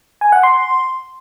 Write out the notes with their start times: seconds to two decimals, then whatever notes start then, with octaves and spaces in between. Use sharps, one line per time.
0.21 G#5
0.32 F#5
0.43 C6